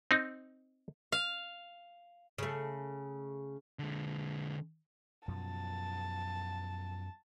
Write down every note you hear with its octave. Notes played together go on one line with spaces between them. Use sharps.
C4 D#4
F5
C#3 A3
D3 G#3
F#2 B2 F3 A5